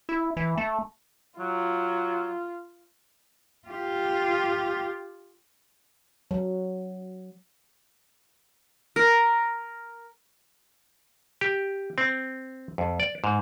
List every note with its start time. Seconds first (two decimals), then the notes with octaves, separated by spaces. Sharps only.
0.09 E4
0.37 E3
0.58 A3
1.39 F#3 F4
3.68 F4 G4
6.31 F#3
8.96 A#4
11.41 G4
11.98 C4
12.78 F2
13.00 D5
13.24 G#2